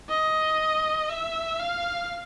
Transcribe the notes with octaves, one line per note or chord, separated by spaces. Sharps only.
D#5
E5
F5